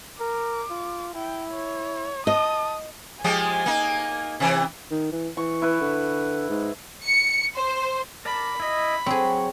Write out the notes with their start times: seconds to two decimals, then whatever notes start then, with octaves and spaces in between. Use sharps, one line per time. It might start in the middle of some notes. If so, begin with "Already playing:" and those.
0.20 A#4 D6
0.70 F4
1.14 E4 G5
1.51 C#5
2.27 D#5 A5 D#6
3.24 F3 G#3 G4 G#5
3.66 A#3 D#4
4.40 C3 E3
4.91 D#3
5.12 E3
5.37 E3 C#6
5.62 E4 B4
5.81 D3
6.50 G#2
7.04 C#7
7.55 C5
8.25 A#4 D5 A5 B5
8.60 E4 D#5
9.06 F#3 C4 G#4 C#5